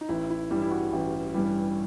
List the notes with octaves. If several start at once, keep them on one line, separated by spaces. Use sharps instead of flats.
D#4
A1 E4
E4
G2 E3 G3 E4
E4
F#4
A1
G2 E3 G3